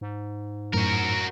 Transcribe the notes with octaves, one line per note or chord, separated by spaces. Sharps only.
G#2
F#2 A2 F#4 A#4